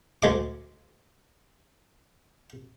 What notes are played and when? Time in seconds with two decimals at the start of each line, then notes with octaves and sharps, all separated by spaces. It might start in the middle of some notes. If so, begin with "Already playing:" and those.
0.23 D2 G#3 D6